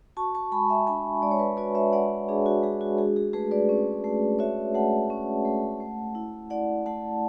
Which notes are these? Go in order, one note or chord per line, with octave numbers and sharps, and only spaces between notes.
F#4 A5 C#6
A5 C#6
G#3 G#5 B5
E5 G#5
D4 G#5 B5
G#3 D5
C#5
B4 D5
F#4 B4 D5
C#5 E5
G#3 D5 F#5
D4 G#4
F#4
G#3 G#4
F#4
F#4 G#4
G#4
A3 G#4 B4
B4 D5
C#4
A3
F#4 C#5 E5
A3 F#5 A5
C#4
A3
A3
E4
E4 D5 F#5
A3 F#5 A5